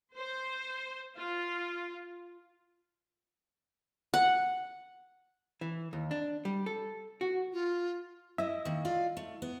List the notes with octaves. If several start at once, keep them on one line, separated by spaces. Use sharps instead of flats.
C5
F4
F#5
E3
D#2
D4
G3
A4
F#4
F4
E4 D#5 E5
D#3 A#3
F4 D5 F5
A3
B3